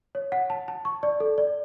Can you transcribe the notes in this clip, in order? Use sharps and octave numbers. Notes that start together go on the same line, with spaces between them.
C#5
F#5
A5
A5
C#6
D5
A4
D5